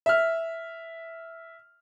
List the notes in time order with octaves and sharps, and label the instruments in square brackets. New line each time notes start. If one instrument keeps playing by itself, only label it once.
[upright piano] E5 F6